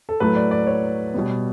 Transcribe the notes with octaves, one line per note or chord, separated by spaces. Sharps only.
A4
A2 F#3 A3 B4
D5
D5
C#5
B2 G3 B3